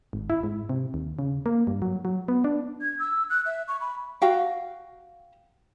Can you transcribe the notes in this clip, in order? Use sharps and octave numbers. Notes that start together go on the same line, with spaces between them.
G#1
E4
G#2
C3
D#2
C#3
A#3
G2
F#3
F#3
B3
D4
G#6
E6
F#6
E5
C#6
B5
F#4 F5 G5